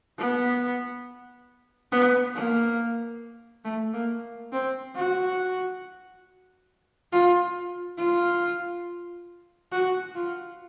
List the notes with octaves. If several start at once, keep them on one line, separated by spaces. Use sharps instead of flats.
B3
B3
A#3
A3
A#3
C4
F#4
F4
F4
F#4
F4